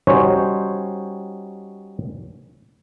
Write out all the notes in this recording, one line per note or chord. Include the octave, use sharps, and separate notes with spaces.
G3 C#4 D#4 F#4 C5 C#5